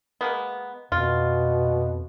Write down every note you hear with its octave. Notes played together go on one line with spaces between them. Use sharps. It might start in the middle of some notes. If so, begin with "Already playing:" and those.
G#3 A#3 B3
F2 B2 F4